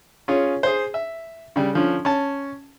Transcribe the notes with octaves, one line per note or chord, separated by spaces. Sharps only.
C#4 F4 G#4 C#5
G#4 C5
E5
C#3 G3
D3 F3 C#4
C#4 A5